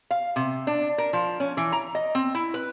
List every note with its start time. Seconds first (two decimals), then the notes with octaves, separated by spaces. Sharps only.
0.11 F5
0.36 C3
0.67 D4
0.98 A#4
1.13 F3
1.40 C#4
1.57 E3
1.72 A#5
1.95 D#5
2.15 C4
2.35 E4
2.54 B4